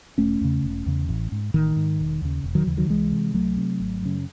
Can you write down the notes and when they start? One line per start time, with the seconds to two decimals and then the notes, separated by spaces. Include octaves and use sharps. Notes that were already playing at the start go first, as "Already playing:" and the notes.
0.18 E1 A3 C#4
0.41 E2 C#3
0.64 E1
0.86 E2 C#3
1.09 A1
1.32 G#2
1.54 A1 D#3
1.76 G#2
1.99 E1
2.22 D#2 C#3
2.44 E1
2.55 D#3 F#3
2.66 D#2 C#3 E3
2.77 D#3 F#3
2.89 C2 E3 G#3
3.12 C3
3.34 C2 F#3 A3
3.57 C3
3.80 G#1
4.02 F#2 C#3